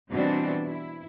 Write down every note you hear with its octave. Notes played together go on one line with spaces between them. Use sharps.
B2 E3 G3 C4 D4 F#4
E4